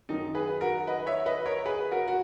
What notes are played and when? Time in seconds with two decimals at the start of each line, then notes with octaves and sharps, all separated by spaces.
0.09 F#2 D#3 F#3 D#4
0.35 G#4 B4
0.61 F#4 A#4
0.87 B4 D#5
1.06 C#5 E5
1.26 B4 D#5
1.46 A#4 C#5
1.65 G#4 B4
1.91 F#4 A#4
2.08 F#4